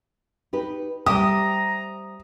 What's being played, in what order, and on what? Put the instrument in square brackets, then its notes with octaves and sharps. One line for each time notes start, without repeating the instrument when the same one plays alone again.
[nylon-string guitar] D#4 G4 B4
[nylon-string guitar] G3 C5 E5 [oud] G4 [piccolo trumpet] A#5 [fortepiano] D#6